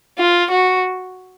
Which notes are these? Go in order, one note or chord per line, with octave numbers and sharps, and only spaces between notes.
F4
F#4